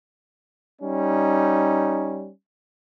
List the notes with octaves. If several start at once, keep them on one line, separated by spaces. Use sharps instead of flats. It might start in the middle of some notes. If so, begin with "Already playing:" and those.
G3 C#4 D#4